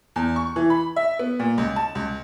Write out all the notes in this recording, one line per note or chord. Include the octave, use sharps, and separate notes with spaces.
E2
C#6
E3
B5
E5
B3
A#2
C#2
A5
C#2